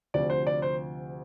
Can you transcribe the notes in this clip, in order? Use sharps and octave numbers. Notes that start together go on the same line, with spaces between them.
D2 C3 F3 D5
C5
D5
C5